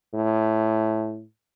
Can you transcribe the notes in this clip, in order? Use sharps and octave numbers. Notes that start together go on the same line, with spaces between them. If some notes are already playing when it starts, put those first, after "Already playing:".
A2